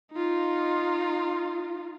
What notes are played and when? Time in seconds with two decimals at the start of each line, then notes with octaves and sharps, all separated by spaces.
0.12 D#4 F4